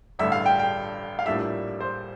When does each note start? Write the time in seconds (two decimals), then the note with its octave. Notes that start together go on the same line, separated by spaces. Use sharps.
0.19 A1 G2 D3 A3 E5
0.32 F5
0.46 G5
0.59 G5
1.19 F5
1.26 A#1 A2 G3 A#3 D4 E5
1.81 C5